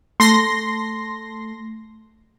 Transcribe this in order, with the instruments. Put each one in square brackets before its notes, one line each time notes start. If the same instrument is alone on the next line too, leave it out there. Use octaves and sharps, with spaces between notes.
[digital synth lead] A3 [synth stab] C6 A#6